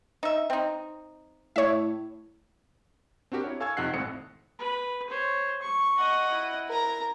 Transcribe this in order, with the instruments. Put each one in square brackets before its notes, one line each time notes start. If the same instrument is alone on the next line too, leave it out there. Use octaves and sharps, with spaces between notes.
[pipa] D#4 E5
C4 D#4
[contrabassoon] A2 [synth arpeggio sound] C#5 E5
[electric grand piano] C4 D4 F#4 G4 A#4
E4 C#5
A4 F5 G#5 C#6 E6 G#6
F2 C3 D#4 F#5 F#6 C7
G#1 A2 C4 A4 D#6 C#7
[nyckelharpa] B4
C5 C#5
C#6
[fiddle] D#5 F#5
[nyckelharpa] E4
[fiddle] A#4 A#5